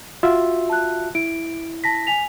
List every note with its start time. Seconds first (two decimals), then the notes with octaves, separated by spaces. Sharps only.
0.23 F4 F#4 E5 C6
0.70 A5 F#6
1.15 E4 D7
1.84 A5 A#6 B6
2.07 G#5 B6 F7